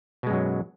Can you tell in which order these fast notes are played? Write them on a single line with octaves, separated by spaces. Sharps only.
B2 G#3 F#2 F#3